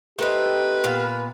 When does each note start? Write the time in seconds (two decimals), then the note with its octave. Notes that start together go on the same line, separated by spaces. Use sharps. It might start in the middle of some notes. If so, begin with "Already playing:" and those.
0.19 A3 C4 D#4 G4 B4
0.84 A#2 B3 F5